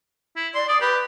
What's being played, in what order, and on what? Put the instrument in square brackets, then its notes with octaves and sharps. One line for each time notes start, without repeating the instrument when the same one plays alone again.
[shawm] E4
[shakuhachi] D5 [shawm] C6
[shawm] D5 [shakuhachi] D#6
[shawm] G4 [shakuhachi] B4